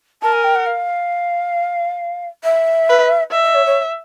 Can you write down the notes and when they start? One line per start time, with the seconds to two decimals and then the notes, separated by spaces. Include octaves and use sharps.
0.22 A#4 A5
0.33 G#5
0.44 G5
0.55 F#5
0.66 F5
2.44 E5
2.89 B4
3.32 D#5 E5
3.43 D#5
3.55 C#5
3.66 C#5